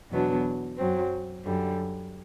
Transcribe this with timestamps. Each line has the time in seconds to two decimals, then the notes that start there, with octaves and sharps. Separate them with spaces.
0.11 E2 B2 F#3 B3 D4
0.78 F#2 F#3 C4
1.45 F#2 D3 G3